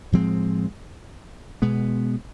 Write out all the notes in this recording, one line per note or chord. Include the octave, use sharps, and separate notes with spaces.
A2 F3 G#3 C4
B2 G#3 B3